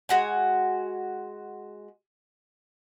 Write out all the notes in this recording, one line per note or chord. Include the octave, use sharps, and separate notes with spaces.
G#3 F#4 G#5